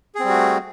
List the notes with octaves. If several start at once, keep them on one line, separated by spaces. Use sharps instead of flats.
G3 A3 C4 F#4 G#4